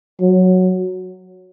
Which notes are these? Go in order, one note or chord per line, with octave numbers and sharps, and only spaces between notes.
F#3